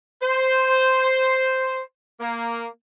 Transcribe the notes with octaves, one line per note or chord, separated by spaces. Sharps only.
C5
A#3